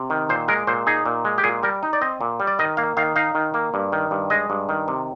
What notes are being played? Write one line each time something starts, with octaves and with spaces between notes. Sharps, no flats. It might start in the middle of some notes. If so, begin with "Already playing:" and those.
Already playing: C3
D#3
A#2 C5
G#3 A#4
A#2 C5
D#4 G#4
A#2
G#3
G4
A#2 G#4
G3 A#4
D#4
D5
C4 D#5
A#2
G3
D5
D#3 D#5
A#3 F5
D#3 F5
D#4 F5
D#3
A#3
G2
D#3
G2
G#3 D#5
G2
D#3
C3